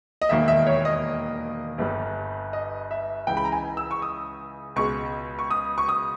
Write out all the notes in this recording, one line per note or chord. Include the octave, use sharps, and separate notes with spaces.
D#5
E1 D#2 D#3 A#3 E5
E5
C#5
D#5
G1 G2 G3
D#5
E5
C#2 C#3 E3 G5
B5
A#5
G#5
E6
C#6
D#6
C#2 B2 G#3 C#6
C#6
D#6
C#6
D#6